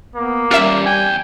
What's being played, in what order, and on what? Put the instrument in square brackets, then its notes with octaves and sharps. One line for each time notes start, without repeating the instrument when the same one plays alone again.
[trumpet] A#3 [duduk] B3
[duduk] G3 [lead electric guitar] C#4 G4 [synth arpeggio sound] F4 A#4 E5
[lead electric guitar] E2 G5 [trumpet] G#5